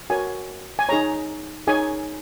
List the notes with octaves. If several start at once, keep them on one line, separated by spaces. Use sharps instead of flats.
F#4 A#4 C#5 G#5
G#5
D#4 G#4 C#5 A#5
D#4 G#4 C#5 G#5